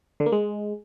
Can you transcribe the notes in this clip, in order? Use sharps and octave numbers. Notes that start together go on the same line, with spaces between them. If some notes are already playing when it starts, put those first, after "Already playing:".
D3
A#3
G#3